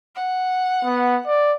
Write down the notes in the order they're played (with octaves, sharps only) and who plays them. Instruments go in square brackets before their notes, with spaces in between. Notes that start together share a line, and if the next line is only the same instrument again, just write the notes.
[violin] F#5
[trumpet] B3
D5